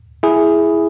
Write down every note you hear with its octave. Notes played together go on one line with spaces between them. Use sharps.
E4 G#4